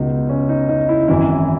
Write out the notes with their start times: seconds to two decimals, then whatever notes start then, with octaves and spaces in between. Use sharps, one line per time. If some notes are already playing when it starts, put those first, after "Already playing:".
Already playing: C#2 B2 D#4
0.29 C#4
0.49 D#4
0.69 D#4
0.89 E4
1.08 G#1 F#2 E3 E4